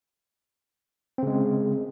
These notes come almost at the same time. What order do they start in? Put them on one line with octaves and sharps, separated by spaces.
C4 C#3 G#3